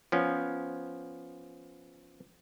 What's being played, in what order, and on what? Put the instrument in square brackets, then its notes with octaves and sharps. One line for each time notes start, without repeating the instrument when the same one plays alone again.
[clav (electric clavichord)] F3 B3 C#4